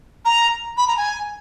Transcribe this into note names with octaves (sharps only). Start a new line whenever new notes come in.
A#5
B5
A#5
G#5